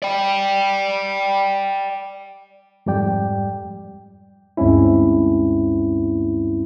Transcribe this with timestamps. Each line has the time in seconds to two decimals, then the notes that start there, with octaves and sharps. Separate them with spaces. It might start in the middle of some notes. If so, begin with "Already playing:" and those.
0.02 D5 G5
2.86 F2 G#2 G3 D5 G5
4.57 D2 G2 G#3 C4 C#4 E4